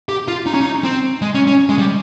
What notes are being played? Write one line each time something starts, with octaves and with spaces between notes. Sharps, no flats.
G4
F4
D#4
C#4
D#4
C4
G#3
C#4
C#4
G#3
G3